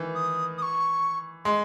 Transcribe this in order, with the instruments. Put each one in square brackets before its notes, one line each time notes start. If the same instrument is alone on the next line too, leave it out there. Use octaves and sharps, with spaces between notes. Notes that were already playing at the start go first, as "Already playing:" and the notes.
Already playing: [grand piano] D#3 E3
[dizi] D#6
D#6
C#6
[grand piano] G#3 [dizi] C6